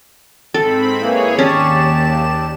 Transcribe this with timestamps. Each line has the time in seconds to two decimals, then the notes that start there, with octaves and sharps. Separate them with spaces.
0.54 G#2 C4 A4 B5
1.00 E3 A#3 E4 G#4 C#5
1.39 D#2 C#4 G4 D5 A5 E7